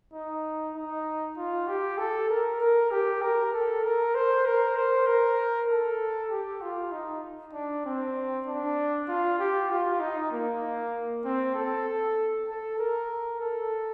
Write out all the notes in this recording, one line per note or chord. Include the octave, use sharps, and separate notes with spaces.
D#4
D#4
F4
G4
A4
A#4
A#4
G4
A#4
A4
A#4
C5
A#4
C5
A#4
A4
G4
F4
D#4
D4
C4
D4
F4
G4
F4
D#4
A#3
C4
A4
A4
A#4
A4